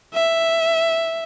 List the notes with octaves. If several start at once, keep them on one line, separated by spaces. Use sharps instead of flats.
E5